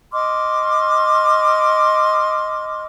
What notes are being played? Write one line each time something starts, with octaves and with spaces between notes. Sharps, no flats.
D#5 C6 D6 F6